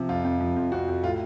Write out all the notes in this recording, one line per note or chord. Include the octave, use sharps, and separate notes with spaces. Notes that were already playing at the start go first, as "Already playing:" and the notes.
Already playing: C3 F3
F2 F4
F2
F3
F2
F2 F#4
F2
A2 F4